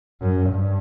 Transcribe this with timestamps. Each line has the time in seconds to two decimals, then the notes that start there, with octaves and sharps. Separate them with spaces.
0.22 F#2
0.50 G2